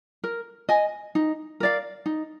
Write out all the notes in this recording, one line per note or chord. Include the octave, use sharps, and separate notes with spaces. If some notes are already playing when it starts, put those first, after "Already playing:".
A#4
D#5 G#5
D#4
A#4 D5 F5
D#4